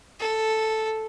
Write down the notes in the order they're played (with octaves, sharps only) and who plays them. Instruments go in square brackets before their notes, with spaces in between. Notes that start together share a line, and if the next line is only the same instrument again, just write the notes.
[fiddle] A4